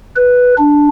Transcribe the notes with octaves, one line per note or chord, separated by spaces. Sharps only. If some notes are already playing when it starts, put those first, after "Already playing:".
B4
D4